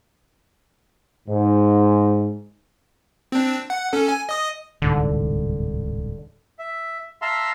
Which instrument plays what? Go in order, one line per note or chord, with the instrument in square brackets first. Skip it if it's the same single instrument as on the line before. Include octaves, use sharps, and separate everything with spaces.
[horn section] G#2
[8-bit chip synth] C4 D4
F#5
C#4 A4
G#5
D#5 D#6
[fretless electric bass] D1 C2 G#2 [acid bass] D3
[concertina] E5
E5 F5 A5 A#5 C6 E6